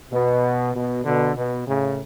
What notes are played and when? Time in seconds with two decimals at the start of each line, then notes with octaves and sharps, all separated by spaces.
0.12 B2
0.74 B2
1.05 B2 D3
1.36 B2
1.66 A2 C#3